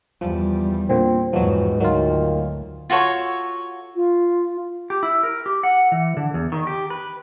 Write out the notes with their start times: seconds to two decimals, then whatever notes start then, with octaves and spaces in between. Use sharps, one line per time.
0.21 E2 F3 G3
0.90 A#2 D3 C4
1.33 E2 G#2 B2 F3 F#3
1.80 D2 D#3 F#3 F4
2.90 F4 F#4 A4 C#5
3.95 F4
4.90 G4
5.03 E4
5.23 A#4
5.46 G4
5.63 F#5
5.92 E3
6.17 D3
6.34 E2
6.52 D#3
6.67 G4
6.90 B4